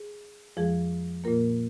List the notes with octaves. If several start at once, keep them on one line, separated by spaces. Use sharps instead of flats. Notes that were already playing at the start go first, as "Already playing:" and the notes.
Already playing: G#4
F2 F3 G#3 G#4
A#2 A#3 F4 A#4